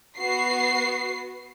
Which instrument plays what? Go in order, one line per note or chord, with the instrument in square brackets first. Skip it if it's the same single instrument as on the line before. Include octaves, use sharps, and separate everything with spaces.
[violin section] B3 F#4 C7